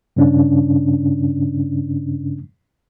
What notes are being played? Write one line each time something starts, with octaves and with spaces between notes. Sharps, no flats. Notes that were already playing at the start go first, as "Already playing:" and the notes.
G2 C#3 C#4 D4